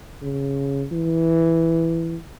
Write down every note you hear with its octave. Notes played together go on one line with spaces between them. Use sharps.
C#3
E3